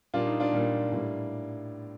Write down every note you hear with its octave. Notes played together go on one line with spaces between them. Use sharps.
A#2 G3 A#3 D4 F4
D#4
D4 F4
A#2 G3 A#3
A2 G3 A#3